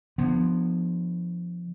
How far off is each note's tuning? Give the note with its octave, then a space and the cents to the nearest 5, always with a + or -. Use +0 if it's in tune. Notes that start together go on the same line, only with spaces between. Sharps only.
D3 +30 F3 +0 B3 +0